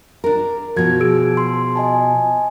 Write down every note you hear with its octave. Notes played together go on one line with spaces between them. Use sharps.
D4 A#4
B2 F3 F#4 G#6
G#4 E6 D7
C6
D#5 G#5 A5